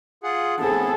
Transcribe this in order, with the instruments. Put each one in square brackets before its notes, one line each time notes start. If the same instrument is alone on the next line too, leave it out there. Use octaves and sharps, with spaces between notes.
[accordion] F4 G#4 F#5
[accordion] A2 B3 C4 [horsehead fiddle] G#4 A4